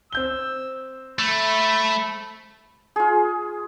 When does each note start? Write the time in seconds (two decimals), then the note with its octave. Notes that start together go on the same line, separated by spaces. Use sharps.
0.12 C4 E6 G6 G7
1.19 A3 B5
2.96 F4 G#4